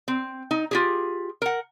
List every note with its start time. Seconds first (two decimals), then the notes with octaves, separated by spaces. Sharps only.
0.08 C4
0.51 D#4
0.71 F4 G4 G#4
1.42 A#4 F#5